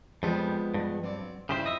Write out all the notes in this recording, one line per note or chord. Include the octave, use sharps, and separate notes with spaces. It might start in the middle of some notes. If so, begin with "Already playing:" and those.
F2 F3 G3 G#3 B3
G2
F#3 C4 D5
G2 C#3 E4 G4 C5
F2 D#5 E5